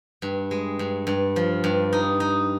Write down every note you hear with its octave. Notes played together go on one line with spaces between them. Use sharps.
G2
G#3
G2
G2
F3
G2
D#4
D#4